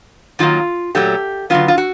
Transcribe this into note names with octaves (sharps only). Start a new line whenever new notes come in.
D#3 F#3 A#3 F4
A#2 F#3 A3 G4
D3 F#3 B3 F4
F4
F#4